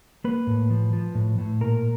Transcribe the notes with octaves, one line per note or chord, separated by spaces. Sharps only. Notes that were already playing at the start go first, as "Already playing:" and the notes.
A#3 B4
A2
F3
F3
A2
A2
A#2 A#4